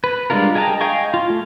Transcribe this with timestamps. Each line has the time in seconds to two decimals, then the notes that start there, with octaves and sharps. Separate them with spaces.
0.04 B4
0.30 G3 G#3 D4 F4 A#4
0.55 G#4 D#5 G5 A5 A#5
0.81 D#5 F5 G5 G#5 C#6
1.14 F4
1.30 A3